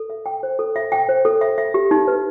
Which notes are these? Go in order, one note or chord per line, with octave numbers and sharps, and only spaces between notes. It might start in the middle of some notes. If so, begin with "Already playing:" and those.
Already playing: A4
E5
G5
C5
A4
E5
G5
C5
A4
E5
E5
G4
D#4
B4